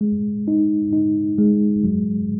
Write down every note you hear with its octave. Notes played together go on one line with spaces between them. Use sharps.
G#3
D#4
D#4
G#3
F#3